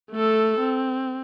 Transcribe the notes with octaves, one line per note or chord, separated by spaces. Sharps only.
A3 A4
C4